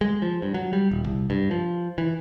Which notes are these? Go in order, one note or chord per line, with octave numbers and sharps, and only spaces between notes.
G#3
F3
G2
F#3
G3
D#1
C2
G2
F3
E3